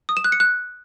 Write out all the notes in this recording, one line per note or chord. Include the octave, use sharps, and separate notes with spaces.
D#6
E7
F#6
C#7
F#6